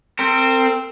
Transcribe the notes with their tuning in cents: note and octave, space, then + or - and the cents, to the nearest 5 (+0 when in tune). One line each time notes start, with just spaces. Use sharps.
C4 +0 A#4 -40